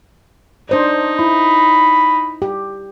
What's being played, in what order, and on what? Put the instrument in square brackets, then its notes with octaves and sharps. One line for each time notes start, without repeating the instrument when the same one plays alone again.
[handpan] D4 C5 D5 [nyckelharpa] D#4
[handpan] E4 [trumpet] B5
[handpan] G4